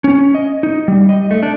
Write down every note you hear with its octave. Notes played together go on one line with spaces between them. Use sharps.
C#4
D#5
D#4
G3
D#5
A3
D4